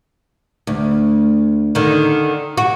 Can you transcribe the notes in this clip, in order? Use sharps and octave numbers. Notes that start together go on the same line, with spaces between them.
D2
D3 D#3
F#4